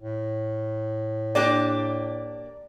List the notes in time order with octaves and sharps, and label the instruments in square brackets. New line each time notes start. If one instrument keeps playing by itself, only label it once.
[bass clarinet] A2
[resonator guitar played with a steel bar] A#3 D4 G4 [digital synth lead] D5